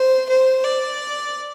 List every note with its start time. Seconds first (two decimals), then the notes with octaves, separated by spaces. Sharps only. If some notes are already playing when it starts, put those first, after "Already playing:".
Already playing: C5
0.29 C5
0.64 D5